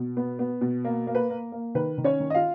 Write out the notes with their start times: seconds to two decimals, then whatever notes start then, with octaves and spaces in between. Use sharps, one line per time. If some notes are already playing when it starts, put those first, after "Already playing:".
Already playing: B2
0.17 B3
0.39 B3
0.61 B2
0.85 A#3
1.07 A#3
1.15 B4
1.30 A#3
1.52 A#3
1.75 D#3 B4
1.98 D#3
2.04 C#4 C#5
2.20 D#3
2.30 D#5
2.34 F4 F5